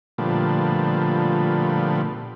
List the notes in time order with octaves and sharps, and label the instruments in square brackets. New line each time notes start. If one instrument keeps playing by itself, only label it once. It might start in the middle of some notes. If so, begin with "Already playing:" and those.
[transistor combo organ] A#2 D3 F3 G3 A3 B3